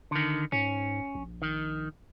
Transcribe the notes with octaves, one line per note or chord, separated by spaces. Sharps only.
D3 D#3
G#2 C#4
A#1
D#3